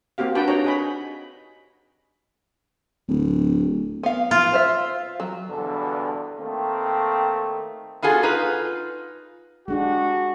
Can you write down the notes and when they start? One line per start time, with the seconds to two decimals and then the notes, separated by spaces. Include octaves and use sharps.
0.18 A#3 C4 F#4 G4 F5
0.35 D4 F#4 G4 B4 G5 A5
0.48 D4 D#4 C#5 G5 A#5
0.65 G#4 D#5 B5
3.08 D1
4.03 B3 F5
4.31 F4
4.53 C5 E5
5.20 F#3
5.49 E2 G2 B2 D3
6.39 D#3 A3 A#3 C4
8.02 B3 F4 F#4 G#4 A4
8.23 D#4 F4 B4
9.68 G#3 D4 F#4 G4